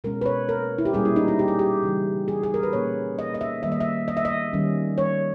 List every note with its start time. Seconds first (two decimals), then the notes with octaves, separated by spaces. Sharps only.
0.04 B2 G#3 C#4 A#4
0.21 B4
0.26 C#5
0.49 A#4
0.78 E4
0.85 G4
0.93 A#2 G3 C#4 G#4
1.05 E4
1.16 D#4
1.28 E4
1.39 G4
1.48 G#4
1.59 G4
1.83 C#3 E3 G3
2.28 G#4
2.43 G#4
2.54 A#4
2.63 B4
2.73 A#2 G3 A#3 C#4 C#5
3.19 D#5
3.34 D#5
3.41 E5
3.63 D#3 G3 A#3 E5
3.72 D#5
3.80 E5
4.08 D#5
4.17 E5
4.25 D#5
4.53 D#3 G3 C#4
4.98 C#5